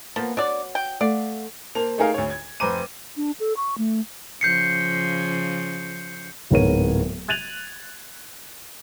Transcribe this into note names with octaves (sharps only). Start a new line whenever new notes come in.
F3 A#3 B3
D4 F#4 C#5 D5
G5
A3 D5 F5 F#5
A#3 C5 A5 F7
A3 D#4 G#4 A#4 F5
D2 C#5
G#6
F1 B4 C5 A#5 D6 D#7
D4
A4
C#6
A3
C#3 F3 G6 C7 C#7
D1 G#2 B3 A#4 C#5 D#7
F#6 G#6 A6 D#7 F7 F#7